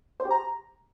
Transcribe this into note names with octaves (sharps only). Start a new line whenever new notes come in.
C5
G4
A#5